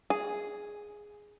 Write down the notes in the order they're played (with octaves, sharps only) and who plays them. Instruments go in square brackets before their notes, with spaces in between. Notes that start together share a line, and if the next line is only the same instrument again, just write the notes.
[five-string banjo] G#4